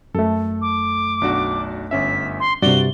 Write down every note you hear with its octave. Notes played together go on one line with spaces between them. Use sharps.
F#2 A3 A4
D6
B1 D4 F#4
G1 C#4 E5 B6
C6
G2 C3 F#4 D5 G7